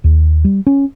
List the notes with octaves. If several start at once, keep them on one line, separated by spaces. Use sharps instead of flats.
D#2
G3
C#4